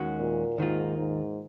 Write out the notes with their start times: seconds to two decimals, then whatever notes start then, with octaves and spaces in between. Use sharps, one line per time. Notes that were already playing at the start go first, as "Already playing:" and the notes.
Already playing: D#2 D#3 G#3 C#4 F#4
0.19 A#2
0.58 D#2 G#2 D#3 A#3 F4
0.98 G#2